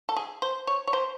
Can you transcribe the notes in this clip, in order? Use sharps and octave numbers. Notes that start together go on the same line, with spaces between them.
A4
G#4
C5
C#5
C#5
C5